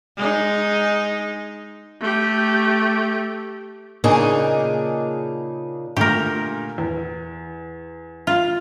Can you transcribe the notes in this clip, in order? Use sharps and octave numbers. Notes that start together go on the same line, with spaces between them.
G#3 D#4
A3 G4
A#2 C#3 A#3 D4 D#4 G#4
A#2 D3 A3 G4 A#4
E2
F4